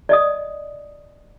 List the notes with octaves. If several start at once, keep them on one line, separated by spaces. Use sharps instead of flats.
D5 D#5 D#6